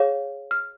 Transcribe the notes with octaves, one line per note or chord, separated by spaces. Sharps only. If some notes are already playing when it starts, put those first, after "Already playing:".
Already playing: G#4 C#5 F5
F6